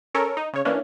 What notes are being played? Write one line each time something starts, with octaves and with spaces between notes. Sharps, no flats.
C#4 A4 A#4 C#5
D#4
C#3 C#5
E3 A#3 C#4 D4